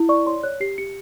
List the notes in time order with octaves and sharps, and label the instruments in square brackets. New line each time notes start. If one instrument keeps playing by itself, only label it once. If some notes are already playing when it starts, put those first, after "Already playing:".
Already playing: [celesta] E4
D5 C#6
C#5 C6
C#5 F#6
G4 C7
G4 C#7